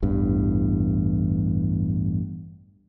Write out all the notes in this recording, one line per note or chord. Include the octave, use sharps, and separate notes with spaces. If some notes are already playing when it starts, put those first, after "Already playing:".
A1 E2 G2